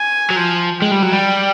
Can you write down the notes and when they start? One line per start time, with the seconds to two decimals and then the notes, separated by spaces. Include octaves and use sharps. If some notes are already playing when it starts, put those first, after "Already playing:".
Already playing: G#5
0.31 F#3
0.37 F3
0.82 G#3 G5
0.92 G3
1.03 F#3
1.12 G3